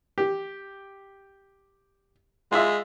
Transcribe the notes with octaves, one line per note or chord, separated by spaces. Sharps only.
G4
G#3 F4 E5